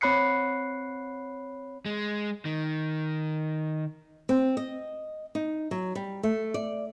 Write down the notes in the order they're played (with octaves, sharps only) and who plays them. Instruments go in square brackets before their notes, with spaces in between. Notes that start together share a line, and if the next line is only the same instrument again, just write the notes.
[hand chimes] C4 C#5 B5 F#6 C7 C#7
[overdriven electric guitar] G#3
D#3
[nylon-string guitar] C4
D#5
D#4
F#3
G3
A3
D5